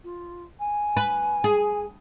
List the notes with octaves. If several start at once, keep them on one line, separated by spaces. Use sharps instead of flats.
F4
G#5
B4
G#4